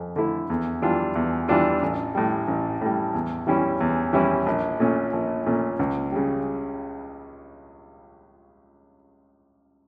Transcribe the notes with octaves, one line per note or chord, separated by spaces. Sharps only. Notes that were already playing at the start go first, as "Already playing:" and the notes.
Already playing: F2
D3 A3 E4
E2
E3 G3 D4 F4
E2
E3 G3 D4 F4
A1
A2 G3
A1
A2 G3
E2
E3 G3 C#4 E4
E2
E3 G3 C#4 E4
A#1
A#2 A3 C#4
A#1
A#2 A3 C#4
C#2
C#3 G3